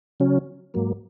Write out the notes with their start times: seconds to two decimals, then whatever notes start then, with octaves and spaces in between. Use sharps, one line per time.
0.20 C#3 F#3 C#4
0.74 G#2 F#3 A#3